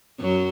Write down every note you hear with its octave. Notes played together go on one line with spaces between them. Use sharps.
F#2 F#3